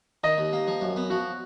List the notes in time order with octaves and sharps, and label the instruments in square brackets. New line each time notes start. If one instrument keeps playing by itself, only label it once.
[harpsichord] D#3 [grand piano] D#5
[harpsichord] D#2
A#3
F3
F#2
B3
[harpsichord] F3 [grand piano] F#4